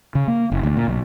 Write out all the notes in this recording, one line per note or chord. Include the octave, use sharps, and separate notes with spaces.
C#3
A#3
F#1
D2
A#2
B1